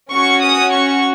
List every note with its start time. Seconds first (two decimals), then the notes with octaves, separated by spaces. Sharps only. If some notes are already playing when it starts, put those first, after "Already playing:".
0.11 C#4 F#4 C#6
0.42 D#6
0.73 C#6